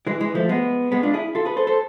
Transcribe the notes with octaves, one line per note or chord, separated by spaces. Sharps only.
E3 G#3
E3 G#3
F3 A3
G#3 B3
G#3 B3
D4 F4
E4 G#4
F4 A4
G#4 B4
A4 C5
A4 C5